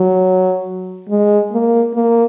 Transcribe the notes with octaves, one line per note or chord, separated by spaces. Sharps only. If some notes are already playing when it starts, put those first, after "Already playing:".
Already playing: F#3
G#3
A#3
A#3